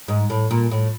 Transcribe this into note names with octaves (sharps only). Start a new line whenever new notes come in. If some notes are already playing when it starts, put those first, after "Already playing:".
G#2
A2
A#2
A2